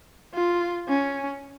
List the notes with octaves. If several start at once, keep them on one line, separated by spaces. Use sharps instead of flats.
F4
C#4